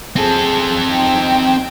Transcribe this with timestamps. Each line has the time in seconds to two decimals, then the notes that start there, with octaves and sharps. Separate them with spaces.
0.16 C4 G#4 A4 A5
0.91 D#4 G5